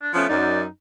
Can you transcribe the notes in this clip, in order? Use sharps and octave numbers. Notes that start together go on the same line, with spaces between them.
D4
F3 A3 B3 C#4
F#2 D#4 D5